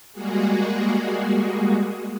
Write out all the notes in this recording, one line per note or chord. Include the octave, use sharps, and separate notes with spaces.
G3 G#3 A#3 F#4 G#4